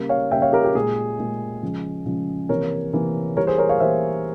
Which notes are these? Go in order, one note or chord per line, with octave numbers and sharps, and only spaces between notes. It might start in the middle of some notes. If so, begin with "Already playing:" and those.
Already playing: C#3 G3 A#3
C#5 F5
C#3 G3 A#3 E5 G5
C#5 F5
G4 A#4
G4
A#2 G#3 G#4
A#2 G#3
C#3 F3 G#3
C#3 F3 G#3
C3 E3 A#3 A#4 C#5
C3 E3 A#3
E3 G3 A#3 A#4 C#5
G#4 C5
A#4 C#5
C#5 F5
E3 G3 A#3 C5 E5